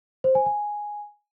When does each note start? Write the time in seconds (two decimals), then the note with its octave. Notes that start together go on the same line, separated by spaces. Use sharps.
0.24 C5
0.35 G#5
0.46 G#5